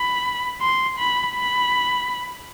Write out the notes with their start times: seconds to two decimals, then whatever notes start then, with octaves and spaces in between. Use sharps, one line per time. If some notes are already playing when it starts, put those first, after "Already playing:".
Already playing: B5
0.61 C6
0.99 B5
1.35 B5